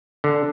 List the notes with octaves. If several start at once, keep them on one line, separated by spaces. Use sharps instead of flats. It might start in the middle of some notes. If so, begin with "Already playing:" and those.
D3